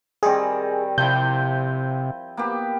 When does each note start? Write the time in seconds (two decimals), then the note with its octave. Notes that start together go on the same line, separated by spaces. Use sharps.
0.23 D#3 G3 C4 G#4
0.98 C3 F3 E4 G6
2.37 A#3 B3 G4